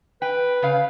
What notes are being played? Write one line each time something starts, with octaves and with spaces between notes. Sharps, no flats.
B4 G5
C#3 F5